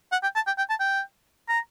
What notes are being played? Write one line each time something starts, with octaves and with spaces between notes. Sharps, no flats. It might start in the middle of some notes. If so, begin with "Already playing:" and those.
F#5
G5
A5
G5
G5
A5
G5
A#5